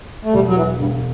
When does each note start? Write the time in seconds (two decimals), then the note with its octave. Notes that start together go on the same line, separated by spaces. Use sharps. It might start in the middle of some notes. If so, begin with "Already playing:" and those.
0.24 A3
0.33 E1 G3
0.47 F#3
0.56 E3
0.78 E1 G2